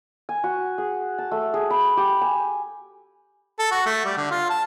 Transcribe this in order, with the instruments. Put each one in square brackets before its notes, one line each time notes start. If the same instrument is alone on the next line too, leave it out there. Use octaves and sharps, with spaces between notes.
[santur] G#5
F#4
G#4
A5
A3
G#4
B5
G4
G#5
[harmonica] A4
F#4
A3
G3
D3
F4
A5